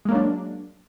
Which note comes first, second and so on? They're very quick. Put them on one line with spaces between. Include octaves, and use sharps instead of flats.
G#3 A#3 F#3 D4